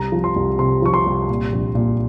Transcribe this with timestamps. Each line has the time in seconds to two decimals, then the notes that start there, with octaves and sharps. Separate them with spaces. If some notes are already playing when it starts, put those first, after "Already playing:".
Already playing: C2 A#5
0.12 F3
0.24 C6
0.36 C2
0.59 C3 C6
0.82 F3 C#6
0.94 C6
1.06 C2
1.29 A#2
1.52 A#1
1.75 A#2